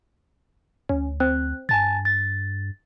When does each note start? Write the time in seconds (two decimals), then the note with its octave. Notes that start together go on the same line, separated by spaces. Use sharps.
0.89 D2 C#4
1.20 C4 F#6
1.69 G2 G#5 A5 A6
2.05 A6